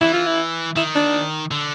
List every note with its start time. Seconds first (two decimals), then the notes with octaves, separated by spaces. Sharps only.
0.01 E3 E4
0.14 F4
0.26 E4
0.76 D#3 E4
0.95 D4
1.51 D3